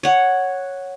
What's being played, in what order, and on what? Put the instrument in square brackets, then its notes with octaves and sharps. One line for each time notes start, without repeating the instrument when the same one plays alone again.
[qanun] C#5 F#5